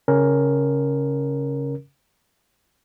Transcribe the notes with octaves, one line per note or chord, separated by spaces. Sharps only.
C#3 C#4 A#4